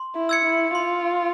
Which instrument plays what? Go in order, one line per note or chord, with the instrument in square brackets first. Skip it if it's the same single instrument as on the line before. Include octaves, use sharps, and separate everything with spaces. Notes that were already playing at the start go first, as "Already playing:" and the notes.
Already playing: [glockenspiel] C6
[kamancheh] E4
[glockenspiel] E6 G#6 C#7
[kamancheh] E4
[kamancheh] F4 [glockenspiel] C6